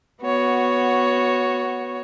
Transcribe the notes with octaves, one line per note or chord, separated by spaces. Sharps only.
B3 F#4 C#5